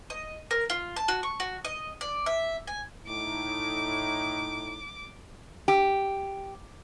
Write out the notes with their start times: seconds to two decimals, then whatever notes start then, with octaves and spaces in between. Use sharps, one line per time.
0.10 D#5
0.51 A#4
0.70 F4
0.96 A5
1.08 F#4
1.23 C#6
1.40 F#4
1.65 D#5
2.01 D5
2.26 E5
2.67 G#5
3.07 A2 D#4 D6
5.68 G4